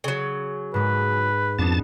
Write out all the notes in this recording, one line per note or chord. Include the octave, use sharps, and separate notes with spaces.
C#3 F#3
G#2 G#3 B4
F2 B3 D4 D#4 A5 A6